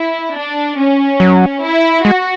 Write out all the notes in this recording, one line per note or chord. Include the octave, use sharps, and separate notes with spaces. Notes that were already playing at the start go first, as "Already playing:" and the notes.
Already playing: E4
D4
C#4
F#3
E4
G#3 F#4